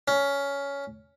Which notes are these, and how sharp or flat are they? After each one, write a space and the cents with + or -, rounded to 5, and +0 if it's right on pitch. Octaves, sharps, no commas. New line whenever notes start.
C#4 +15